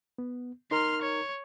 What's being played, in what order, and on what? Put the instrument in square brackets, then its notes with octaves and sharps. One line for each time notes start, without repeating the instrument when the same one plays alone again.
[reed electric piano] B3
[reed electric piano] D#4 A#4 A#5 [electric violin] C6 F6
[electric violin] C#5